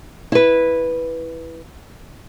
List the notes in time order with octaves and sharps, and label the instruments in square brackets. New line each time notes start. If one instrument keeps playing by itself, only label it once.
[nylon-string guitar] E4 B4